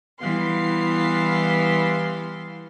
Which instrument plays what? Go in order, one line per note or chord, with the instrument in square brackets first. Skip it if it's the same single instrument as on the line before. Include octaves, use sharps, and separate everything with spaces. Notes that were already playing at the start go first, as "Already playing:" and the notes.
[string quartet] E3 G3 B3 F5 C6